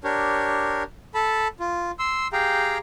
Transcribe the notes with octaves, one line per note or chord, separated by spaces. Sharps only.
D4 G4 A#4 C#5
A4 A5 B5
F4
C6 E6
G4 G#4 F5 G5 A#5